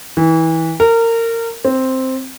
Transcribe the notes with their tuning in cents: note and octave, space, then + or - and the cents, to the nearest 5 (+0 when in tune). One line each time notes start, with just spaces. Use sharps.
E3 -25
A#4 -25
C4 +0